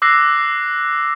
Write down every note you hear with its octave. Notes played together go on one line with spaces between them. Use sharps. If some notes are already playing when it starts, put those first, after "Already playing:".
D6 E6 F#6 A#6 C7